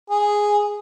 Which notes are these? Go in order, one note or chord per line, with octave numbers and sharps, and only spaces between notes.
G#4